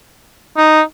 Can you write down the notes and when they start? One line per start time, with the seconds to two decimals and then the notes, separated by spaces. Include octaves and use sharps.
0.57 D#4